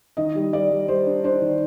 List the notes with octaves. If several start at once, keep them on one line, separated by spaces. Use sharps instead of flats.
D#3 D#5
G3
G3 D5
G3
G3 C5
D4
D4 C5
D#3